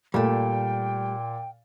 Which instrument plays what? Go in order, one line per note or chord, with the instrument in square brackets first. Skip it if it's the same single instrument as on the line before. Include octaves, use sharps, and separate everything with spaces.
[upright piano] A#2 [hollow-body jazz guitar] G3 A3 [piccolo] G5